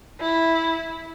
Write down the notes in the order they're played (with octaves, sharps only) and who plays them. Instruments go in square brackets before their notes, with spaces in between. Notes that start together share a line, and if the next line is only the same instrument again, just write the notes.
[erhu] E4